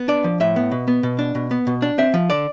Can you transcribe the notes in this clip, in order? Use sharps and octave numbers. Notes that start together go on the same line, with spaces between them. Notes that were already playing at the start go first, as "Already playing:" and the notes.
Already playing: B3
D4 D5
F3
A2 E5
B3
B2
B3
B2
D4
B2
B3
B2
D4
C4 E5
F3
D3 D5